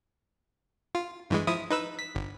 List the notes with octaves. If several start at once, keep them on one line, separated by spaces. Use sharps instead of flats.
F4
G2 E3 G#3
F3 E4 D#6
D#4 B4 E6
B6
G1